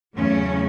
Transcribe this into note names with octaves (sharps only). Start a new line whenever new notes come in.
E2 C#3 F#3 A3 C#4